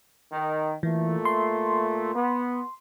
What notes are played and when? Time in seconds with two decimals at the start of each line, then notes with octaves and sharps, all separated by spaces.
0.32 D#3
0.83 A#2 E3 A3
1.25 C6
2.13 B3